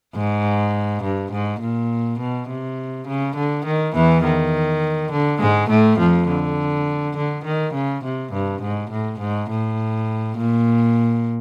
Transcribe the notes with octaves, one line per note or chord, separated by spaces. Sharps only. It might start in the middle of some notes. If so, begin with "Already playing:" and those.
G#2
G2
G#2
A#2
B2
C3
C#3
D3
D#3
E2 E3
D#3
D3
G#2 G#3
A2 A3
F2 F3
D3
D3
D#3
C#3
C3
G2
G#2
A2
G#2
A2
A#2